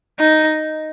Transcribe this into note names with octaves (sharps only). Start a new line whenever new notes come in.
D#4